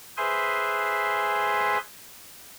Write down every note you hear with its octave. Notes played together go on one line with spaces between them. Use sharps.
G#4 B4 C5 E5 G#5 C6